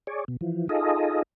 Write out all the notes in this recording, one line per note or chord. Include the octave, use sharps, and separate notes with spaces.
G#4 C#5 D5
B2
E3 F3
D#4 F4 G#4 A4 D#5